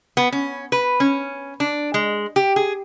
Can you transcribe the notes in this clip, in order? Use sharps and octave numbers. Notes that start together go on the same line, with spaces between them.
B3
C#4
B4
C#4
D4
G#3
G4
G#4